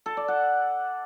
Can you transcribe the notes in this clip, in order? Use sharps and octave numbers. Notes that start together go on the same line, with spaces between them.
A4
D5
F#5